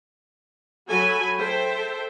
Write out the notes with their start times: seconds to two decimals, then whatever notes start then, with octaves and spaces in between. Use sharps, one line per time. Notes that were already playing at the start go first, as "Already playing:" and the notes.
0.88 F#3 F#4 A4 G#5 B5
1.36 A4 C5 E5 G5